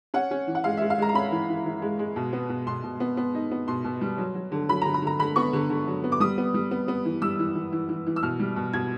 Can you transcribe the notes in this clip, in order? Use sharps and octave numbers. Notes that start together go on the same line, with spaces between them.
C#4 F#5
C#4
E3
F#5
G#3 F5
G#3 E5
F5
G#3 A#5
A#5
C#4 B5
E3
E3
E3
G#3
G#3
B2
B3
B2
B2 C6
B2
B3
B3
D#4
B3
B2 C6
B2
G3
F#3
F#3
D3
F#3 B5
A#5
D3
B5
D3 A#5
D3 B5
B3 C#6
D3
D3
F#3
B3
D6
G3 D#6
B3
G3
B3
B3
E3
G3 E6
E3
E3
E3
E3
E3
E6
B2 F6
G3
B2
B2 G#6